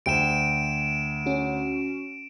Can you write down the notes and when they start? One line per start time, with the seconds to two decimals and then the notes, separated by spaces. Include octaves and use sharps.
0.06 D2 G5 D7 E7
1.26 C#4 F#4